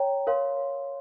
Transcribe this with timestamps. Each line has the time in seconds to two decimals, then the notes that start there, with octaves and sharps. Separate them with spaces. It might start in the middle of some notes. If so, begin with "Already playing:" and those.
Already playing: C#5 G5 A#5
0.27 A#4 C#5 F5 C6